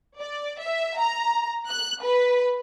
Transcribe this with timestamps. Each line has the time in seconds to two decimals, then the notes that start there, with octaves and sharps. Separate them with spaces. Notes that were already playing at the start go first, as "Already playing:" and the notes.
0.19 D5
0.60 E5
0.99 A#5
1.69 F#6
2.03 B4